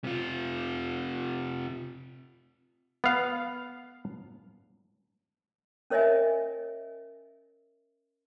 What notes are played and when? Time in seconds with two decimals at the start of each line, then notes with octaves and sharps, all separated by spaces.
0.04 C3 F4
3.04 B3 F5
5.90 C#4 A#4 C#5 D#5 E5 G#5